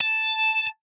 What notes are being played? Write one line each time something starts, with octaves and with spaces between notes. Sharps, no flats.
A5